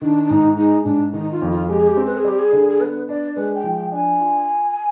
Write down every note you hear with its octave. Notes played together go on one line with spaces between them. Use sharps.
D#3 D4
D4
G#2 D#4
G#3 D#4
G#2 D4
D#3 D#4
F4
F2
F4
G#3 G4
G#4
G4
C4
B4
G#4
G3 G4
G#4
D3
G#4
B3 B4
D4 D5
G#3 B4
G5
F3
G5
D4 G#5
F4